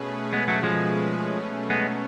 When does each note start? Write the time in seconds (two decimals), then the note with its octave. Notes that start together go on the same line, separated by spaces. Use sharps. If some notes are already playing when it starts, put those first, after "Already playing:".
Already playing: B2 A3 C#4 G#4 B4
0.33 G#3 B3
0.48 F#3 A3
0.63 F3 G#3
1.24 B2 F#3 A3 C#4
1.70 G#3 B3